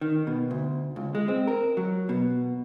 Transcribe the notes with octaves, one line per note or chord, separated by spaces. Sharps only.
D#3
B2
D2
C#2
G#3
C4
A#4
F#3
B2